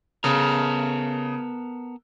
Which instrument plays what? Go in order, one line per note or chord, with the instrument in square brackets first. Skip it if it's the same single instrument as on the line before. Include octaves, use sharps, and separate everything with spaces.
[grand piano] C#3 [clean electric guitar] B3 A4 A#4